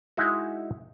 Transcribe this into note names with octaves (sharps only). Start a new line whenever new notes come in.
G#3 D#4 E4 F#4